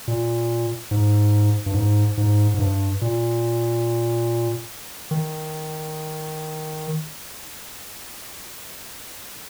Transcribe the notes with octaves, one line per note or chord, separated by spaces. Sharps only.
A#2
G#2
G2
G#2
G#2
G#2
G2
A#2
D#3